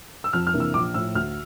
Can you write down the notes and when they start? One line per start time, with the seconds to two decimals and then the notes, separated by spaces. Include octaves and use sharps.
0.24 E6
0.33 F2 F6
0.47 F6
0.54 C3 E3 A#3 D4
0.60 E6
0.74 A#1 D6
0.94 A2 F3 E6
1.15 D2 F6